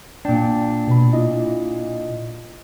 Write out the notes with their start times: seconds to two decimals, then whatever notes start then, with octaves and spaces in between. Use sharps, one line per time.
0.25 A#2 D4 G5
0.87 B2 B5
1.13 E4 F4 D#5